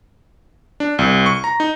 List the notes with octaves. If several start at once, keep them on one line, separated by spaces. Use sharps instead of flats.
D4
C2
C#6
A#5
D#4